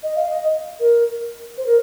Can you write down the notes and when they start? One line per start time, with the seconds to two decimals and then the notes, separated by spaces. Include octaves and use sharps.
0.03 D#5
0.16 F5
0.29 D#5
0.80 A#4
1.58 C5
1.66 A#4